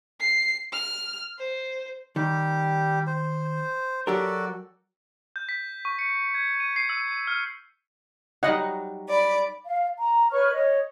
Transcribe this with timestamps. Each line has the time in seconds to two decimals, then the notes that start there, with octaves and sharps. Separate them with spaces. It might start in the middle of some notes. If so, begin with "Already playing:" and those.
0.20 C7
0.72 F6
1.39 C5
2.16 D#3 G3 G4
3.07 C5
4.07 F#3 F#4 G4 A4 A#4 D5
5.36 G6
5.49 B6
5.85 C#6
5.99 C#7
6.35 G#6
6.60 D#7
6.76 C7
6.89 E6
7.27 F6
8.43 F#3 G3 D#4 D#5 F#5
9.09 D5 B5
9.64 F5
9.99 A#5
10.31 B4 C#5 C#6 F6
10.53 C#5 D#5